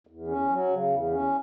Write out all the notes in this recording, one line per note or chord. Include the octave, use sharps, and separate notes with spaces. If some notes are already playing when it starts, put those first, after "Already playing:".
E2
C#4
F#3
C#3
E2
C#4